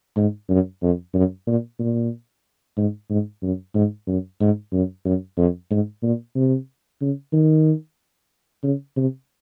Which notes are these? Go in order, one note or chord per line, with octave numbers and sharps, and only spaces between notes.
G#2
F#2
F2
F#2
A#2
A#2
G#2
G#2
F#2
G#2
F#2
G#2
F#2
F#2
F2
G#2
A#2
C3
C#3
D#3
C#3
C3